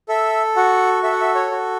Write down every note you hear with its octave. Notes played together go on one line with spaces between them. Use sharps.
A4 E5
F#4 F#5
A4 E5
F#5
E5
C#5
F#4